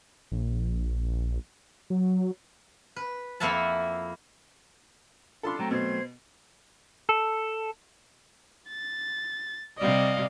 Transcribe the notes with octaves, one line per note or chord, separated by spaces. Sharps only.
A#1
F#3
B4
F2 A#3 E4 E5 F#5 A5
D4 F4 A4 A5 B5 C6
F#3 A3 C4 G5 A#5
B2 C5 G#6
A4
A6
C3 G3 D5 D#5 F5